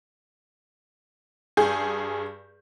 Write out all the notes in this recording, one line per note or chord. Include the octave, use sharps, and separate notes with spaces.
G2 G#4 G#5 G6